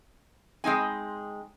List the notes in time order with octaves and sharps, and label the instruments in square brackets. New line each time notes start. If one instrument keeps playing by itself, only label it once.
[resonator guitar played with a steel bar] G#3 C4 D#4 G#5